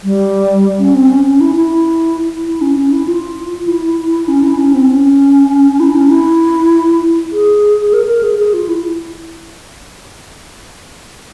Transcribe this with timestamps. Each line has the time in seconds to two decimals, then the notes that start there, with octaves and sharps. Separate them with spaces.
0.04 G3
0.79 C#4
0.95 C4
1.10 C#4
1.26 C#4
1.41 E4
1.55 E4
2.47 E4
2.61 C#4
2.77 C#4
2.92 E4
3.07 F4
3.67 E4
4.28 C#4
4.43 E4
4.58 C#4
4.75 C4
4.90 C#4
5.80 E4
5.95 C#4
6.10 E4
7.32 G#4
7.93 A#4
8.08 A#4
8.23 G#4
8.38 G#4
8.54 F4
8.68 E4